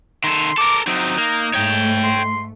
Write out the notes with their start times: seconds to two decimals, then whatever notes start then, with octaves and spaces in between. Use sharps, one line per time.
0.24 D#3 A4 C6
0.58 A4 A#4 D6
0.87 F#3 C4 D#4
1.18 A#3
1.54 G#2 A3 C#5 G5
2.04 C6